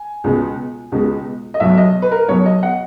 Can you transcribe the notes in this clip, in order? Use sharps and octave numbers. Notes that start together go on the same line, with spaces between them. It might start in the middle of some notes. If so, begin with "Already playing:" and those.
Already playing: G#5
C#2 B2 G#3
C#2 B2 G#3
D#5
B1 B2 F#3 E5
D#5
B4
A#4
B1 B2 F#3 C#5
D#5
F#5